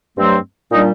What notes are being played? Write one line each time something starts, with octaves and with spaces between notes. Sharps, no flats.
G2 F#3 A3 C4
A#2 G3 D4 D#4